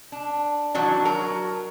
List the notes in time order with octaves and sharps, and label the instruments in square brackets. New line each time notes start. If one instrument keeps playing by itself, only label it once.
[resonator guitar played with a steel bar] D4
D#3 E3 F#3 D4
F#3 A#4